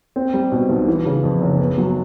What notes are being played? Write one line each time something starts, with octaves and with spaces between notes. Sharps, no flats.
C4
G3
B2
B1
E3
C#3
F2
F#1
B3
F#3